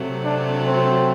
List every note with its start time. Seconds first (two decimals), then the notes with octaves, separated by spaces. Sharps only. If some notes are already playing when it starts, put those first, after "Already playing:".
Already playing: C3 F#3 A3
0.24 D4
0.65 C4